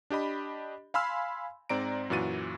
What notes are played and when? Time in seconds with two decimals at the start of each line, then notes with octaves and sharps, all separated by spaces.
0.10 D4 G4 D#5 B5
0.94 F5 G#5 B5 C6 E6 F6
1.69 G#2 C4 D5 A#5 D7
2.10 F#2 A#2 E3 F#4 A6 D#7